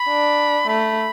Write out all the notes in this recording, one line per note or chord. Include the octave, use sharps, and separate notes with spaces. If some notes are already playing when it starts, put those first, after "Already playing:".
Already playing: B5
D4
A3 B5